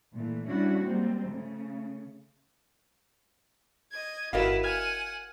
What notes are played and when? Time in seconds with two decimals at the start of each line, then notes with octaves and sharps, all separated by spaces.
0.12 A#2 E3 A3
0.46 G3 C#4 D4 E4 F#4
0.82 G3 G#3 A#3 C4
1.26 C#3 A3
3.91 D#5 G#6
4.33 G1 E4 F#4 A#4 B4 D#5 F5 E7
4.64 F#5 G#5 F6 G#6